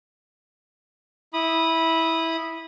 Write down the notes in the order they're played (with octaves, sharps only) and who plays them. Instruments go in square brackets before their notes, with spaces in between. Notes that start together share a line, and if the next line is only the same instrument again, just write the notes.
[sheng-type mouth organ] E4 B5 D#6